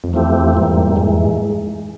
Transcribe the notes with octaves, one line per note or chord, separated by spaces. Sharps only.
F2
E2 F3 A3 C4 E4 G4
F2
E2
F2 G#2 E3 G3 A#3
E2
F2
E2
F2 G#2 E3 G#3
E2
F2
A2